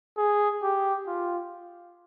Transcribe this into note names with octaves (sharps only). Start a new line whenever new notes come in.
G#4
G4
F4